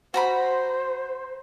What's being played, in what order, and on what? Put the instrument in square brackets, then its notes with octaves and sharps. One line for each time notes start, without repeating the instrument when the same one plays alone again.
[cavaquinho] F#4 A#5 B5 [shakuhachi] C5